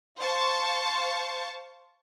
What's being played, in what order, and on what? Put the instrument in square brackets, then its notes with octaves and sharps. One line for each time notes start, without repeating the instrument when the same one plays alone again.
[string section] C5 F5 A5 C#6